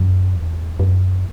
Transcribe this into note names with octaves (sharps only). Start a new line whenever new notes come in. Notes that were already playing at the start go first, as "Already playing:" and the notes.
Already playing: F#2
E2
F#2